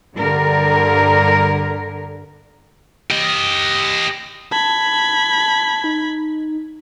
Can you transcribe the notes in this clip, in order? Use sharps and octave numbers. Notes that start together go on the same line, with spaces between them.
G2 D3 A#4
G4 D#5
A5 B5 G#6
D#4